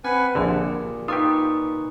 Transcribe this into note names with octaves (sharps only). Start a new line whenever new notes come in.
C4 B4 F#5 G#5
A#1 A#2 D3 G4 G#4
D#4 F4 G4 B4 C#6 D#6